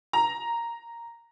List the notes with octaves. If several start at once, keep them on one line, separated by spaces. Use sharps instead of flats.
A#5